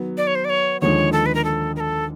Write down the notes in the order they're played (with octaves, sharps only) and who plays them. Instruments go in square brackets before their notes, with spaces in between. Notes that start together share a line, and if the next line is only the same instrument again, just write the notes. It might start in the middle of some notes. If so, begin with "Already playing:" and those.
Already playing: [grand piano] D#3 F#3 B3
[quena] D5
C#5
C5
D5
C#5
[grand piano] D#2 D3 F3 G#3 [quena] C#5
[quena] A4
B4
A#4
A4
A#4
A4